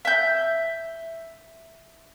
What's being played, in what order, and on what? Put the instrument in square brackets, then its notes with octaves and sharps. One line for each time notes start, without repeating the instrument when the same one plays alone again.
[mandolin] E5 G6